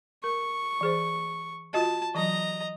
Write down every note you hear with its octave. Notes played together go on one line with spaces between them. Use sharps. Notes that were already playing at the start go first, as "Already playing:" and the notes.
A#4 C#6
E3 G#4 C5
F4 F#4 D#5 A5
E3 F#3 D#5 A#5